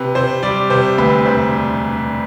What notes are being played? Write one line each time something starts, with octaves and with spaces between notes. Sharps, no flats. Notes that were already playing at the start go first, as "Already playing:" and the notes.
Already playing: C3 B4
C3 C5
G3 D5
C3 C5
D2 B4
E1 C5